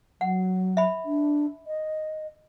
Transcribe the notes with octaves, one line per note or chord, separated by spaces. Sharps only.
F#3 F#5
E5 B5
D4
D#5